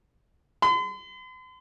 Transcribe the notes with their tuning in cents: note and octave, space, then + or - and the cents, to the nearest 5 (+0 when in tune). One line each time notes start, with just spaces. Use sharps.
C6 -45